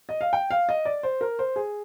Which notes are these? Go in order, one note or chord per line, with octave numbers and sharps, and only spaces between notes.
D#5
F5
G5
F5
D#5
D5
C5
A#4
C5
G#4